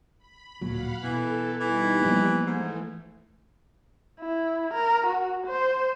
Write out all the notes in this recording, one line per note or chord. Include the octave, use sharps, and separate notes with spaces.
B5
D1 A#2 F#3 F5 F#5 B5
B2 E3 A4
E3 G3 D#4 G4
F3 A#3 B3
G#2 E3 A3
E4
A#4
F#4
C5